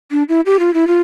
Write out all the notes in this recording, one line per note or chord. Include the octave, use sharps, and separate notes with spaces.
D4
E4
G4
F4
E4
F4